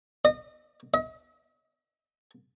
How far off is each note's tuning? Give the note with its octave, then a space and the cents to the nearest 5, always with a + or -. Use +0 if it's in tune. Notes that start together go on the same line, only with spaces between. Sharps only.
D#5 -30
D#5 +40